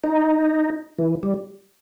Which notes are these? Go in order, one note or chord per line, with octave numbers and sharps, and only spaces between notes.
D#4
E3
G3